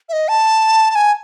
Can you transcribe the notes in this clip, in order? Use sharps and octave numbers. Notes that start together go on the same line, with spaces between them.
E5
D#5
A5
A5
G#5